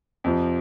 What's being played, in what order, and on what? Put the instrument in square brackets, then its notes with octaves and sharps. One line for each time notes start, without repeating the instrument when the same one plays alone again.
[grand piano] F2 C3 F3